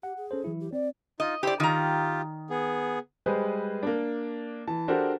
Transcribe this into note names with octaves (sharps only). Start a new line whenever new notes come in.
G4 F#5
G#4
C#4 A4 C5
E3 F#3 E4
G4
C4 D5
D#4 F4 D#5
E4 G4 C5 D5
D#3 F4 G4 A#5
B3 G#4
G3 G#3 G#4 B4 C5
A#3 D4
E3 A5
D4 F#4 G4 A4 A#4 C5